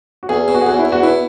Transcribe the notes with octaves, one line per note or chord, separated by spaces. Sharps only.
F#4
E2 G#4
B2
F#4
G#4
E2 F#4
E4
E2
F#4
B2 E4